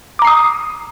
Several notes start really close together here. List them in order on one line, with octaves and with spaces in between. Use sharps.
D6 A#5 C7 D#6